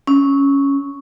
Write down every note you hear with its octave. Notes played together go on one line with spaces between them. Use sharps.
C#4